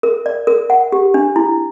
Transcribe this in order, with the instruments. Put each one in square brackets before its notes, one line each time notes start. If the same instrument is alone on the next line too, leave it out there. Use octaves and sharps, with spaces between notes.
[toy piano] A#4
D5
A#4
F#5
G4
D4
E4